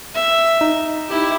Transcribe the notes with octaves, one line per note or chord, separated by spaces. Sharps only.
E5
D#4
E4 G4